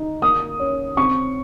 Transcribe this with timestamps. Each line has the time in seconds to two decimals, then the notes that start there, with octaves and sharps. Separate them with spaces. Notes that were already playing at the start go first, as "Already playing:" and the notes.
Already playing: D#4
0.22 A#3 D#6
0.59 C#4
0.97 C4 C#6